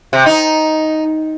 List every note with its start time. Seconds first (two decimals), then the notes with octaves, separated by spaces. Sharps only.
0.13 C3
0.26 D#4